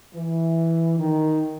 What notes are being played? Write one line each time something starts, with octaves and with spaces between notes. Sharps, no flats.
E3
D#3